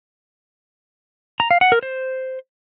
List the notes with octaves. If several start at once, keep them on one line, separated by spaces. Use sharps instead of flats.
A#5
F5
F#5
A#4
C5